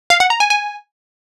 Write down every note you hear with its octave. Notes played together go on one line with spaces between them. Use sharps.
F5
F#5
A#5
G#5
G#5